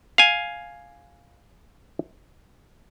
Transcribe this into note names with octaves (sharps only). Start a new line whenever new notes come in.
F5 G#5